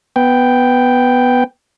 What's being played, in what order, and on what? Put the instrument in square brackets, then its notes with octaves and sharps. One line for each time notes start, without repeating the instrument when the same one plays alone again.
[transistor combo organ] B3 G5